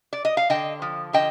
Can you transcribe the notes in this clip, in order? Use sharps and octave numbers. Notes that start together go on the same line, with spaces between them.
D5
D#5
F5
D3 D#5 G5
F3
D3 D#5 G5